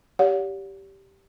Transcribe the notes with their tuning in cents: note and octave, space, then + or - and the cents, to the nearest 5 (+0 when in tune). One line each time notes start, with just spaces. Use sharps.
G4 -5 C#5 +45 F#5 -45